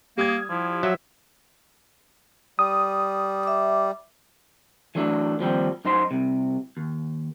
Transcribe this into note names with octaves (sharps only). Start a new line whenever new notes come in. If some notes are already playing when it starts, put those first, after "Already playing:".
G3 A#3 D#6 G#6
F3 E4
F#3 E5
G3 D#6
E5 D6
E3 F#3 A3 D4
D#2 F3 G3 C4
F#2 D#4 C5 C6
C2 C3
D#2